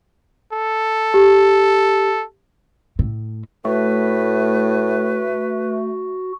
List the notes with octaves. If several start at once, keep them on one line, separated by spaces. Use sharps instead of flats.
A4
G4
A2
A2 A3 F#4 B4